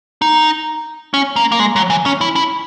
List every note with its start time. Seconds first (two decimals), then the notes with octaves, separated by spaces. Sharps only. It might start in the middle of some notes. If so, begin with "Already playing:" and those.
0.22 D#4
1.14 C#4
1.36 A#3
1.52 A#3
1.59 G#3
1.76 F#3
1.90 E3
2.06 C#4
2.21 E4
2.36 E4